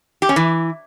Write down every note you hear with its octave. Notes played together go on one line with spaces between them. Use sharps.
G4
C#4
E3